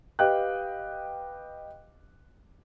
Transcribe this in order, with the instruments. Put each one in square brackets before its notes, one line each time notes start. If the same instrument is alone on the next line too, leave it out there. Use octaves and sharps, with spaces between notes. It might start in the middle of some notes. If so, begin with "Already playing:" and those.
[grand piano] G4 B4 D#5 F5 G5 F#6